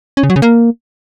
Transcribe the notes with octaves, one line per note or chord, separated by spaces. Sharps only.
C#4
C#3
F#3
C#3
A#3